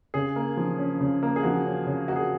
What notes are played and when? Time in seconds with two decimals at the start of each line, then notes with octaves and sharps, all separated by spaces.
0.14 C#3 G#4
0.36 A#3
0.57 F3
0.79 C#4
1.01 C#3
1.23 A#3
1.36 G#4
1.43 F3 F#4
1.66 C#4
1.87 C#3
2.08 A#3 F#4
2.16 G#4